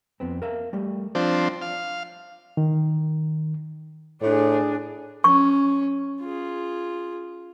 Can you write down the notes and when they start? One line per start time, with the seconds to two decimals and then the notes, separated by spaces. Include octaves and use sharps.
0.20 F2 B3 C4
0.42 A#4 E5 F5
0.73 G3 A3
1.15 F3 C4 D4 C5
1.62 F5
2.57 D#3
4.21 A2 D4 G#4
5.24 C#4 C#6
6.21 F4 G#4